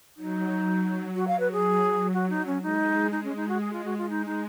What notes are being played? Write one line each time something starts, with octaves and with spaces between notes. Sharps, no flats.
F#3 D#4
F#3
F#3 F#4
F5
B4
G#4
F#4
D#4
C#4
G#3 D#4
D#4
C#4
D#4
F#4
G#4
F4
F#4
F4
G#3 D#4
D#4